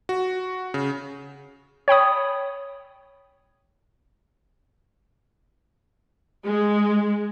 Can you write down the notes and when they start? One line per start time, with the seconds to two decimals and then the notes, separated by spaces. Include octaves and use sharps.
0.09 F#4
0.74 C#3
1.88 C#5 G5 B5 D#6
6.45 G#3